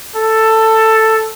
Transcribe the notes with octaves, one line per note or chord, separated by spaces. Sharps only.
A4